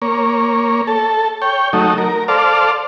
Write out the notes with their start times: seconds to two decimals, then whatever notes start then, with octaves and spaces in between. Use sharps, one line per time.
0.02 A#3 C#5
0.87 A4
1.42 C#5 G5
1.73 F#3 A3 D#4
1.98 A#4
2.28 A4 C5 D5 F5